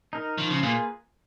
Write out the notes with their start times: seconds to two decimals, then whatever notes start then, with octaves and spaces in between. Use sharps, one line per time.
0.13 D#4 A#4
0.38 D#3 F3
0.50 C#3
0.63 A#2 A#3 F4 G#4 B4